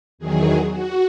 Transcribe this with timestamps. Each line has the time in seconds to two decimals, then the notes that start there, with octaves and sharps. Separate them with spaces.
0.18 E2 D#3 F#3 G#4
0.69 F#4